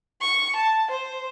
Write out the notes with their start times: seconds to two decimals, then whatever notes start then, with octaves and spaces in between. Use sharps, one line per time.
0.21 C#6
0.55 A5
0.91 C5